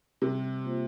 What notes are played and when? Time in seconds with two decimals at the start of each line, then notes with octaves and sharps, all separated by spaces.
0.22 C3 G3
0.64 A#3 F4 C5